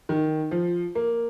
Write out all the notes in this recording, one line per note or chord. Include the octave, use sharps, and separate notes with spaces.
D#3
F3
A#3